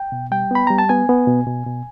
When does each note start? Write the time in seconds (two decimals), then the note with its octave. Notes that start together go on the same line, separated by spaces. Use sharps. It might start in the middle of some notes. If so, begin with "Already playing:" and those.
Already playing: G5
0.12 B2
0.31 G3 G5
0.51 B3 B5
0.67 G3 A#5
0.78 A5
0.89 B3 G#5
1.09 B3
1.28 B2
1.47 B2
1.66 B2